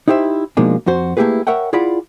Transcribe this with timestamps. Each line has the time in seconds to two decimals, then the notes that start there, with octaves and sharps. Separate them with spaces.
0.08 D#4 E4 G4 C5 E5
0.57 B2 F3 G#3 A#3 D4 D#4
0.87 F2 F#4 C5
1.17 A3 A#3 E4 G4 G#4 B4
1.47 A#4 C#5 E5 F#5 G5
1.73 E4 F4 G#4 D5 F#5 B5